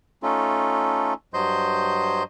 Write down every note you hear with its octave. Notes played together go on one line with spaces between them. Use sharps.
A3 C#4 D#4 F4 A4
G2 F#3 C5 D#5 C6 G6